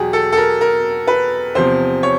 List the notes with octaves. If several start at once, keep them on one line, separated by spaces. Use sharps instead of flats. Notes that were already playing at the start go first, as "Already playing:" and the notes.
Already playing: E2 B2 F#3 G4 G#4
A4
A4
A#4
A#4
B4
E2 C3 F3 C5
C#5